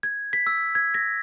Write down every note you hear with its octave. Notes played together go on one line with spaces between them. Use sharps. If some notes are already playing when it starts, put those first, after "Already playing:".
G#6
B6
E6
G#6
A#6